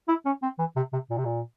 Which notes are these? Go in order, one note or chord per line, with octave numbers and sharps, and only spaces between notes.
E4
C#4
C4
E3
C3
C3
A#2
C3
A#2